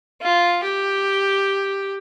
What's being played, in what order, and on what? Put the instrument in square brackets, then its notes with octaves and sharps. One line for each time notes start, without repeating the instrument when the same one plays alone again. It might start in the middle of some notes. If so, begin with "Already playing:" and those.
[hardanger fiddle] F4
G4